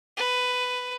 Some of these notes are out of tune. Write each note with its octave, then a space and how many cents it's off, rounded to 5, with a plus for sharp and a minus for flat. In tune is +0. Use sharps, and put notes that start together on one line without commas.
B4 +10